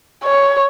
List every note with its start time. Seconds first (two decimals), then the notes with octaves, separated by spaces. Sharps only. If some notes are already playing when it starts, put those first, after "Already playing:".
0.24 C#5